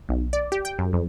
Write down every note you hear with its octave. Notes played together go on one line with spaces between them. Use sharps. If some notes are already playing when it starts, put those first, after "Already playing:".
B1
D5
G4
G5
F#2
F2